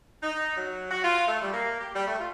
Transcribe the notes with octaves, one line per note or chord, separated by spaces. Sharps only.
D#4
F#3
F#4
F4
A3
G3
A#3
G4
G3
A3
F4